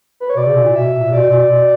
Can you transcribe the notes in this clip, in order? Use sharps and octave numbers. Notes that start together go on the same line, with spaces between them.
B4
C#5
B2 D5
C#3
B2
A#2
B2 E5
A#2
B2 D5
B2
B2